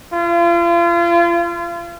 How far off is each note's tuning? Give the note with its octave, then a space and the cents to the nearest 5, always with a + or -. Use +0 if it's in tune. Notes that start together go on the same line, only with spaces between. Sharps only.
F4 -35